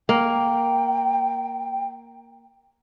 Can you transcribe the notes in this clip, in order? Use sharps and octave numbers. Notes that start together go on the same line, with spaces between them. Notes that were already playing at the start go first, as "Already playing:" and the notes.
A#3 G5